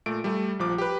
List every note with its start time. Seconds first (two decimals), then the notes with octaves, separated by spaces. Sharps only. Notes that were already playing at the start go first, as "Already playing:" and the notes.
0.06 A#2 A3 D7
0.24 G3 A3
0.59 A#1 F3 D6
0.78 G4 B4